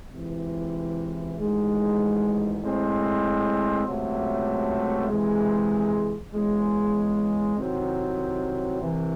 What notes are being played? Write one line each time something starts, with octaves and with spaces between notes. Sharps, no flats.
C#2 C3 E3
A1 G#2 D#3 G#3
A2 G#3 C4
C#2 C3 F#3 A3
C3 E3 G#3
E2 C#3 G#3
C2 C3 D#3 F#3 C4
C2 C3 E3